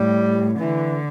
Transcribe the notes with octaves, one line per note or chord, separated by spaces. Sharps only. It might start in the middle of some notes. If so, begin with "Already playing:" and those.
Already playing: A2 G3
D3 E3